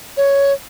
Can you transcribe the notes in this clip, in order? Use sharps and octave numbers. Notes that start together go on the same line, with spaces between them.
C#5